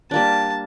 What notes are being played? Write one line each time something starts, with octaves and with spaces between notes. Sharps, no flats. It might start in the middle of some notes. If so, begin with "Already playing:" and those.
G3 A#3 D4 A5